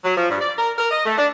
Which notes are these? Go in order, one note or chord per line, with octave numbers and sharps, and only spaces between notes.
F#3
F3
G2
D5
A#4
A#4
D#5
A3
D4